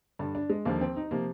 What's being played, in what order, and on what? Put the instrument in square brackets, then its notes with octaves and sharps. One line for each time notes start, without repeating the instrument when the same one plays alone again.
[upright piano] G2 D3 G3 D4
D4
G#3
D#2 D3 F3 A#3
C4
D#4
C3 F3 A#3